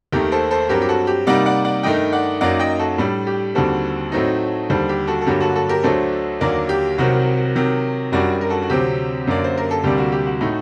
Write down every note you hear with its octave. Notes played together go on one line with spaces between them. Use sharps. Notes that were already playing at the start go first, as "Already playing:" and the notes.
D#2 D#3 A3 G4 A#4
A4 C5
A4 C5
G2 F#3 C4 G4 A#4
G4
F#4 A4
G4
C3 G3 A#3 D#4 D5 F#5
D5 F#5
D5 F#5
G2 D#3 A3 D#4 D#5 G5
D5 F#5
F#2 F#3 A#3 D#4 D5 F#5
D#5 G5
F#4 A4
A2 G3 D4
G4
D#2 D3 G3 C4 F#4 A4
A2 F#3 A3 C4 D#4
D#2 D3 G3 A4 C5
G4
F#4 A4
A4
G2 D3 F#3 A#3 G4
F#4 A4
F#4 A4
G4 A#4
D2 D3 F#3 A3 D4 A4 C5
D#2 D3 F#3 A#3 A#4 D5
G4
C2 C3 D#3 F#3 C4 F#4
C3 D#3 F#3
F#2 D#3 G3 D4 F#4
A#4
F#4 A4
F#4
D2 C3 F#3 C4 G4
F#2 D3 F#3 A#3 D5
C5
A#4
A4
D2 C3 G3 A#3 D4 G4
F#4
G4
F#4
A2 A3 D#4